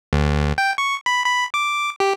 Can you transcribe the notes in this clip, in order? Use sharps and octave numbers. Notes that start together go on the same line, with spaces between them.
D2
G5
C#6
B5
B5
D6
G4